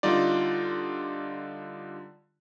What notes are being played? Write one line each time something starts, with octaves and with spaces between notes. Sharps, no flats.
D3 G3 D#4 F4 D5